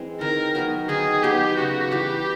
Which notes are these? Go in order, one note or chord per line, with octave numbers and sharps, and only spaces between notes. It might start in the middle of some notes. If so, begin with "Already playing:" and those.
Already playing: E3 G#3 C4
D#3 A#4
F#3 B3 D#4
D#3 G#4
F#3 B3 D#4 G4
C#3 F#4
E3 G3 G4